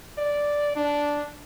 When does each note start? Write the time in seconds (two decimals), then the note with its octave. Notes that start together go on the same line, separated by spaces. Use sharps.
0.18 D5
0.76 D4